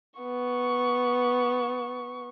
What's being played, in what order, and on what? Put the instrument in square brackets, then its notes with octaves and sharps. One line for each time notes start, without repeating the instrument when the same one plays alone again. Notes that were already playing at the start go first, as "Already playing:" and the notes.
[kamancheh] B3 C#6